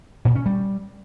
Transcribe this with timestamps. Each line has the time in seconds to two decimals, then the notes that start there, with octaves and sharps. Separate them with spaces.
0.25 A#2
0.35 C#4
0.46 G3